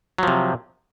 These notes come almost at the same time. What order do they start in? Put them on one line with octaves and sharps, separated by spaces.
F#3 F3 C3